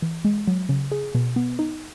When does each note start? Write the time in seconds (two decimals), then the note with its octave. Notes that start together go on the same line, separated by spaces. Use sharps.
0.02 E3
0.25 G#3
0.47 F#3
0.69 C#3
0.92 G#4
1.15 B2
1.36 B3
1.59 D#4